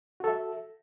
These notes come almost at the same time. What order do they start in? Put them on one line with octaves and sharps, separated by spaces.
F#4 A4 E5